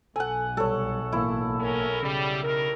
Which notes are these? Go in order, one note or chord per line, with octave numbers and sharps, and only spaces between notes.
B1 A4 F#5 G#5
C2 G3 A4 C#5
A1 A#3 E4
A2 C#4 A#4
C#3 G3
D#3 G3 A#4